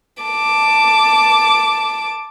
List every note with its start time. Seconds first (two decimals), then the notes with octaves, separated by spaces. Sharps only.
0.24 A5 D6